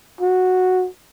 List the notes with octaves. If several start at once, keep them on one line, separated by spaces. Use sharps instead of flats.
F#4